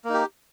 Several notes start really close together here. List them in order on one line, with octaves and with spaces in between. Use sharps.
A#3 D#4 G4